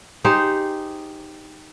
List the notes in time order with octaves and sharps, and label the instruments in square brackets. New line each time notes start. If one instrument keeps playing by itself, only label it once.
[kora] D#4 G4 G#4 C5